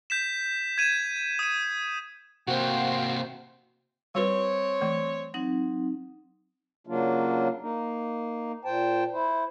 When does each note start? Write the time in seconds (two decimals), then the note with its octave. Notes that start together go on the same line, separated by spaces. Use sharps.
0.10 G6 B6 E7
0.78 G#6 D#7 E7
1.39 D#6 D#7
2.47 C3 A#3 F#4 C5 F5 G5
4.15 G3 C4 F#4 B4 C#5
4.81 E3 A3
5.34 F#3 C4 D#4
6.87 C#3 F#3 A#3 D4 F4
7.61 A#3 D#4
8.65 A#2 C5 G5 A5
9.13 E4 C5